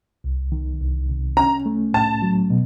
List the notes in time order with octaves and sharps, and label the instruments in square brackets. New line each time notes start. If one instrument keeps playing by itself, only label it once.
[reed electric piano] C2
D#3
C2
C3
[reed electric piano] C#4 [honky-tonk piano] A#5
[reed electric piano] A3
[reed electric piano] A2 [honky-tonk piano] A5
[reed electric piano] F#3
B2